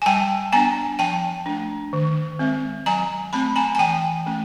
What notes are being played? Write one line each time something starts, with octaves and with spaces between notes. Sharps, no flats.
G#5
G3 G5 A5
B3 D4 G#5 A#5
F3 G5 A5
A3 D4
D#3
G#3 C4
F#3 G#5 A#5
A3 C4 A5 B5
G#5 A#5
G#5
E3 G5 A5
A3 C#4